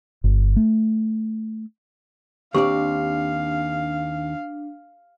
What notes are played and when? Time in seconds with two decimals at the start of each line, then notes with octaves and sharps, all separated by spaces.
0.24 G1
0.56 A3
2.54 D#2 C4 D4 G4 D5 F5